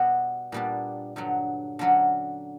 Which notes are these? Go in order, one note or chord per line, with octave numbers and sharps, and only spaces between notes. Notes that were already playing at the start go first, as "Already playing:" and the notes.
Already playing: B2 G3 B3 F#4
A#2 G3 B3 D4
G2 D3 F#3
D3 F#3 C#4 F#4